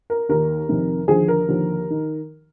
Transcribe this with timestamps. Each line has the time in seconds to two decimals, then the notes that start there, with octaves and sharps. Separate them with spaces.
0.10 A#4
0.29 D#2 D#3 A#4
0.69 F2 C3 D#3
1.07 D#2 D3 F3 G#4
1.28 A#4
1.48 D#2 D3 F3
1.90 D#3